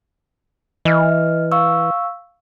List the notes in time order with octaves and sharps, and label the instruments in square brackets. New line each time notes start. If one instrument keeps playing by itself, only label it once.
[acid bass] E3 [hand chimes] D#5 F6
[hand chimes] F5 C#6 E6